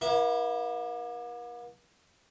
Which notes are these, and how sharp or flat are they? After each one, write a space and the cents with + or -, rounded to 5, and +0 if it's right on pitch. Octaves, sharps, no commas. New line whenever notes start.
A#3 +45 E4 +0